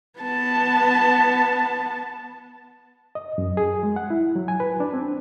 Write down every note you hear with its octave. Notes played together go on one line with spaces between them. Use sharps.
B3 A5
D#5
F#2
G#4
G#3
F#5
E4
F#3
G#5
B4
D4
C4